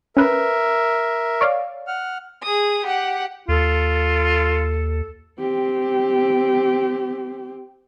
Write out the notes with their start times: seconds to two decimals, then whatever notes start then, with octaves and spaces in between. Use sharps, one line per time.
0.17 C#4 A#4 B4 E5
1.41 C#5 D5 F5
1.87 F#5 F6
2.43 G#4 D#6
2.85 G4 F#5
3.48 D#2 F4 A4
5.39 C4 G4